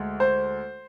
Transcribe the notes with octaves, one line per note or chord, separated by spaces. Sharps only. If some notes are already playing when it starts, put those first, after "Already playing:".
Already playing: D2 G#3
C5